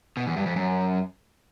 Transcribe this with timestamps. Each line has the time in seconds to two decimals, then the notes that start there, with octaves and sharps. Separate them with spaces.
0.17 B2
0.27 E2
0.37 G2
0.46 F2
0.56 F#2